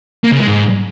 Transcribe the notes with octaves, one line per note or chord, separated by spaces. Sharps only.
A#3
C#3
G#3
G#2